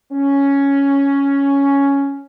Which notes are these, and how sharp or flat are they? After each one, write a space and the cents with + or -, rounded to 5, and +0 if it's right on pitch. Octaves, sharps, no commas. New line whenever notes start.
C#4 +5